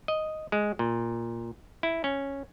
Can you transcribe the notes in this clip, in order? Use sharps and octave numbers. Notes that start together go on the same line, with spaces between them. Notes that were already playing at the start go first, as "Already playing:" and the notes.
D#5
G#3
A#2
E4
C#4